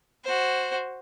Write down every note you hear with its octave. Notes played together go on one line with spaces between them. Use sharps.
F#4 C5